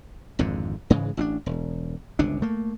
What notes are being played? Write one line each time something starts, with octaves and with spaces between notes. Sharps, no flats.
G#1 F2 G#2 D3
G#2 C#3 E3 G#3
A1 C#4 D4
E1
G1 C#2 C3 D4
A3 A#3